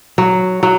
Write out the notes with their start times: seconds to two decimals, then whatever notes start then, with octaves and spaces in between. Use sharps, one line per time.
0.18 F#3
0.63 F#3